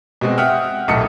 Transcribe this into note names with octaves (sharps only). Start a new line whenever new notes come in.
B2 G#3 C4
E5 F#5 G5 D#6 F6
D#1 B1 A2 A4 D#6 C#7